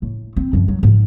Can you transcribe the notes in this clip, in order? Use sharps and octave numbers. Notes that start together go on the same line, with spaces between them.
A2
C4
F#2 F3
F#3
G#2 F3